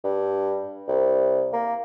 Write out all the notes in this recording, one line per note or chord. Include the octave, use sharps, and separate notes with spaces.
G2
C2
A#3